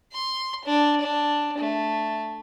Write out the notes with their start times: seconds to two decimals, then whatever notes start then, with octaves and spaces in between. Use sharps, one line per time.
0.12 C6
0.65 D4
1.01 D4
1.58 A3